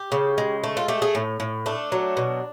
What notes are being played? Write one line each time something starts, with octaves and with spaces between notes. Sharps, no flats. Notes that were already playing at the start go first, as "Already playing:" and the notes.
Already playing: G4
C#3
G#3
A3
F4
A3 G4
G#4
A2
A2
A3 D4
F#3
B2